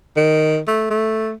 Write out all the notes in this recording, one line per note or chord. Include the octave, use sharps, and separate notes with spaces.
D#3
A3
A3